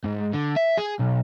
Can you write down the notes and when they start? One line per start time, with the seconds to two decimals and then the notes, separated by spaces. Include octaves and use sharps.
0.04 G#2
0.33 D3
0.56 E5
0.77 G#4
0.99 B1